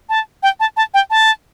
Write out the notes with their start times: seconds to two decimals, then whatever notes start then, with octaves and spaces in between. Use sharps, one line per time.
0.09 A5
0.43 G5
0.60 A5
0.77 A5
0.94 G5
1.10 A5